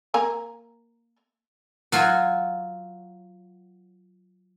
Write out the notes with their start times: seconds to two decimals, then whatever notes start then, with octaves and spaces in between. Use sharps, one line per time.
0.14 A#3 G#5 A#5
1.92 F#3 F4 F#4 C#5